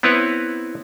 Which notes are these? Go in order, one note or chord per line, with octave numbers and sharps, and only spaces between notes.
B3 C4 E4 B4 C#5